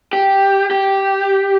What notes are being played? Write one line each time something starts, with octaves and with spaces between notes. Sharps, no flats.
G4
G4